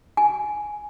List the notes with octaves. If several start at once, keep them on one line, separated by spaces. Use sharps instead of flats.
G#5